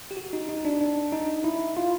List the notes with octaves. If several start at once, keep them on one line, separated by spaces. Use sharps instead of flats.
G4
F#4
D#4
D#4
D4
D4
D#4
E4
F4